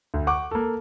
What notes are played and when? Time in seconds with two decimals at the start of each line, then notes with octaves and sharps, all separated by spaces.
0.14 D2
0.27 F#5 C#6 D6
0.51 A#3 A4